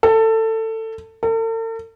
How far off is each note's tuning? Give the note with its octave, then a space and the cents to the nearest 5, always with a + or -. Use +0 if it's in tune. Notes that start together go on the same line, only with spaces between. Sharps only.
A4 +20
A4 +45